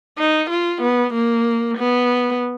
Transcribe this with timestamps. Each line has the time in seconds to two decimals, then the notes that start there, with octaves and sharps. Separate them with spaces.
0.18 D#4
0.50 F4
0.82 B3
1.13 A#3
1.77 B3